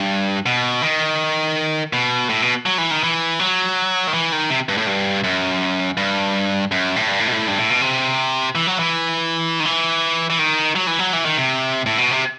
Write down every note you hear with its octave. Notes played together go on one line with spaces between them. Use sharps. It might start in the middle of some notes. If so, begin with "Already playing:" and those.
Already playing: G2
B2
D#3
B2
A2
B2
F#3
E3
D#3
E3
F#3
D#3
E3
D#3
C3
G2
A2
G2
F#2
G2
F#2
A2
G2
A2
B2
A2
G2
A2
B2
C3
E3
F#3
E3
D#3
E3
E3
D#3
F#3
E3
F#3
E3
D#3
C3
A2
B2
C3